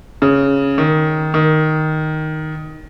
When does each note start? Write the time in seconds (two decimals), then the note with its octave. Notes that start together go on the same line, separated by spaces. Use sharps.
0.22 C#3
0.78 D#3
1.34 D#3